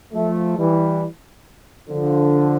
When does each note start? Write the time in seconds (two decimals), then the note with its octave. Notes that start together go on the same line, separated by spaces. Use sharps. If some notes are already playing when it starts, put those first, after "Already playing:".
0.13 F3 A3
0.58 E3 G3
1.89 D3 F3